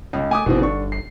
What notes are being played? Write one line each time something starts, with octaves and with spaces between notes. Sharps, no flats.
C#2 C#3
A3 G#5 D6 D#6
G1 B2 E3 C4
D3 D4 C#6
C7